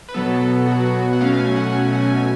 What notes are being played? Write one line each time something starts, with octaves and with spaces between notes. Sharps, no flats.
B4
B2 F#3 B3 A4
F#4
F#4
F#5
B2 F#3 A3 C#4 F5
G#5
F#5
G#5
F#5
G#5